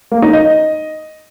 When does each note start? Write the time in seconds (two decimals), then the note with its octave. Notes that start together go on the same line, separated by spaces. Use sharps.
0.11 A#3
0.22 D#4
0.33 D#5